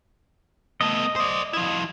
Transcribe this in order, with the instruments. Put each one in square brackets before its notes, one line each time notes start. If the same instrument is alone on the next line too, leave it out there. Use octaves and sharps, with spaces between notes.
[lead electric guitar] A3 B3 [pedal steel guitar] D#5
[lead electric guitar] C5 D5
F3 E4